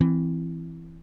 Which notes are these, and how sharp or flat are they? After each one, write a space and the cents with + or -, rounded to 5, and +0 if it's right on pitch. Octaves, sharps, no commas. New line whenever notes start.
E3 +5 C4 -10